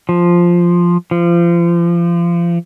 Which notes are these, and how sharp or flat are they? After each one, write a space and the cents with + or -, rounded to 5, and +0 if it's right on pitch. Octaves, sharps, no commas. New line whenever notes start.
F3 +0
F3 -30